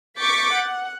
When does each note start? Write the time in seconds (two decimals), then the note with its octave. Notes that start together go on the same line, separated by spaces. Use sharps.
0.19 C#6 D6 G6 A6 B6 C#7
0.55 F#5